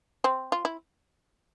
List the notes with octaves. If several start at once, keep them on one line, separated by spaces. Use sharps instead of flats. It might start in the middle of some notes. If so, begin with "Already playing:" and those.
C4
F4
E4